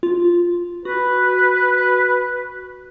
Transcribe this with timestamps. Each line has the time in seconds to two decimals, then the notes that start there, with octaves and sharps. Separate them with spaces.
0.03 F4
0.85 F#4 B4